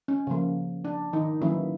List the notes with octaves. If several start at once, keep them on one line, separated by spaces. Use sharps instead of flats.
C#4
C#3 F3 A#3
D4
D#3 D#4
D#3 E3 F#3 A#3 C#4 E4